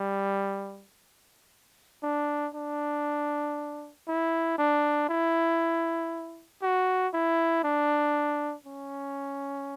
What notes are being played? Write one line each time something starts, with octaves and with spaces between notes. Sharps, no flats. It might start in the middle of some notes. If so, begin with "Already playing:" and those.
Already playing: G3
D4
D4
E4
D4
E4
F#4
E4
D4
C#4